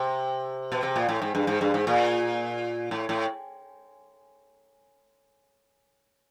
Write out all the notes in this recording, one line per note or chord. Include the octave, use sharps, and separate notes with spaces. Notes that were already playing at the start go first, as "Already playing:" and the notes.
Already playing: C3
B2
C3
A#2
A2
G#2
G2
G#2
G2
G#2
A#2
A2
A2